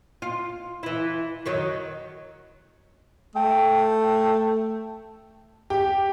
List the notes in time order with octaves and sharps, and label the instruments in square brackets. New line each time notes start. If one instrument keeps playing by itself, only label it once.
[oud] F4
E3 E4
F#2 D#3 F#3
[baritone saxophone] A3 [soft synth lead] G5
[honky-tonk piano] G4